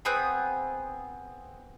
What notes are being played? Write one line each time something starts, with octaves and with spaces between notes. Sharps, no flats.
B3 C4 G#4 B5